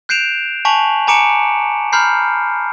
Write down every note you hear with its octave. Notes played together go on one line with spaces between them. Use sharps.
F#6 G6 C7 D7 E7 F7
G#5 A5 C#6 B6 F7 F#7
G#5 A#5 D6 C#7 D7 E7
A#5 B5 F6 G6 C7